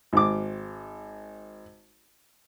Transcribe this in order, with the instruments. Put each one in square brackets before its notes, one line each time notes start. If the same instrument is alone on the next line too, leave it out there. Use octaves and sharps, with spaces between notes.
[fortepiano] G#1 D6